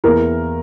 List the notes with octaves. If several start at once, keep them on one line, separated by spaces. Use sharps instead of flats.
E2 E3 A#3 A#4